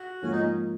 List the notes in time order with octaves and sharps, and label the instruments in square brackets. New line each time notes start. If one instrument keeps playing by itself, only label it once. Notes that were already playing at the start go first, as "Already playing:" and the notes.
Already playing: [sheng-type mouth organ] F#4
[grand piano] G#2 F3 A#3 F4 [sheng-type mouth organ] C#4
[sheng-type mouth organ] D#4